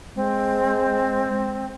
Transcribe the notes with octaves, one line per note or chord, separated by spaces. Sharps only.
G#3 C4